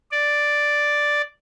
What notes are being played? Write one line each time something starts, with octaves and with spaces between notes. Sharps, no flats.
D5